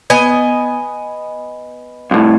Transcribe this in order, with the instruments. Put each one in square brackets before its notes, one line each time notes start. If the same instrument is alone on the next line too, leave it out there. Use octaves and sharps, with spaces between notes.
[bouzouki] B3 D#5 G#5
[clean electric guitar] C2 A2